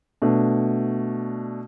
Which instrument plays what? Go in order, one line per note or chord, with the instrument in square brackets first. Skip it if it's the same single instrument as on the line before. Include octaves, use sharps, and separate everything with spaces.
[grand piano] B2 A3 D4